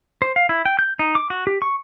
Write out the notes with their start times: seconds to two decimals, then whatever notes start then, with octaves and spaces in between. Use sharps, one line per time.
0.22 C5
0.36 F5
0.49 E4
0.66 G5
0.79 G6
0.99 D#4
1.15 D6
1.30 F#4
1.47 G4
1.62 C#6